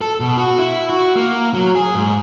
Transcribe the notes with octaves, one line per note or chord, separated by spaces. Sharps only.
A4
B2
F#4
E4
F#4
A#3
F#3
G#4
G#2